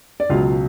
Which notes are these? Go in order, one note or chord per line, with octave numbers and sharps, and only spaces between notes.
D5
C#2 B2 F#3 F4 F5